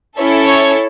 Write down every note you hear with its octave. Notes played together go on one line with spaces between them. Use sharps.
C#4 E4 A4 C#5
C#5